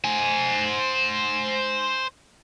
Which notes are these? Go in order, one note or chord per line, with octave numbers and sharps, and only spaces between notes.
C5 G#5